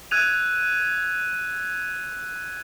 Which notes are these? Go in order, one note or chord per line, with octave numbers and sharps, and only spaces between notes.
E6 F#6 G#6 D#7 F7